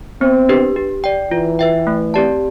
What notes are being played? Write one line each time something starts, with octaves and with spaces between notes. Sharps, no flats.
B3 C4
D4 G4 B4
G4
D5 G5
E3 F4
B4 E5 G5
A3
C4 G4 D5 A5